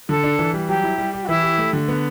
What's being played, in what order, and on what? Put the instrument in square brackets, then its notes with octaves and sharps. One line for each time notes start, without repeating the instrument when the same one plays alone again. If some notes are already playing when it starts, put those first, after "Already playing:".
[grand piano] D3 [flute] A4
[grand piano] D4
E3
G3
[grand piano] F#3 [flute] G4
[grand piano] E4
G3
G4
[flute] F#4
[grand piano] E3 [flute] E4
[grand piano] G4
A3
D3
B3